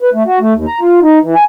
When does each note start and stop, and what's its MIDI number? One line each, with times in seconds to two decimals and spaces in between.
0.02 0.10 71
0.14 0.23 57
0.27 0.39 66
0.41 0.53 57
0.54 0.66 39
0.67 0.80 82
0.81 1.00 65
1.03 1.19 63
1.23 1.35 52
1.35 1.44 80